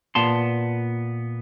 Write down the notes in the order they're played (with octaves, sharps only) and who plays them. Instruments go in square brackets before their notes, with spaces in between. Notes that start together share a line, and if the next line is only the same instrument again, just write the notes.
[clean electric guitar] A#2 B3 A5 C6